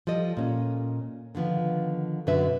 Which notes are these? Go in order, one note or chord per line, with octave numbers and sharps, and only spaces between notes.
F3 G3 A4 D#5
A#2 C#4
D3 D#3 F3 B3
F#2 B2 D3 F#3 B4 E5